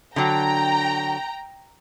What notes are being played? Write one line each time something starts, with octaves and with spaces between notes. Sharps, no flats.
D3 F#3 G5 A#5